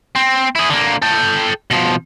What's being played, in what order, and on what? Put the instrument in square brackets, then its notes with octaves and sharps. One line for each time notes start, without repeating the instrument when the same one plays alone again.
[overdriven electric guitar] C4
E4 G#4
D3 A#3
A4 G5
B2 F3